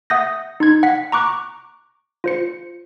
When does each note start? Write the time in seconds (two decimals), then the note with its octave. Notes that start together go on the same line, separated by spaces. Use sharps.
0.10 E5 F#5 D#6 G6 A#6
0.60 D#4 C6 G#6
0.83 F#5 B6
1.12 A#5 C#6 D6 F#6
2.24 F4 C5 C#7